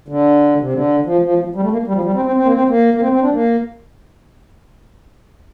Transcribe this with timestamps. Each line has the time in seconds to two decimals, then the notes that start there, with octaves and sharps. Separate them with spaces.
0.08 D3
0.60 C3
0.73 D3
1.06 F3
1.23 F3
1.38 F3
1.56 G3
1.64 A3
1.72 A#3
1.87 G3
1.95 F3
2.04 G3
2.15 C4
2.25 C4
2.36 C4
2.45 A#3
2.52 C4
2.69 A#3
2.94 A#3
3.01 C4
3.12 C4
3.22 D4
3.34 A#3